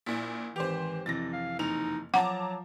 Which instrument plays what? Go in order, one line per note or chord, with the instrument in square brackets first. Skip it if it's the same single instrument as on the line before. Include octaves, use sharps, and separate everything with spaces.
[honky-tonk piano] A#1 A#2 [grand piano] E4 B6
[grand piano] G#1 D6 F7 [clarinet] E3 [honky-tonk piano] G4 C5
[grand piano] F2 C3 E3 [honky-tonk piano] A6 A#6
[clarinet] F5
[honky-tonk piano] F#1 F7 [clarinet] D#4
[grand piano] F3 [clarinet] F#3 [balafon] F#5 [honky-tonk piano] A5 A#5 D6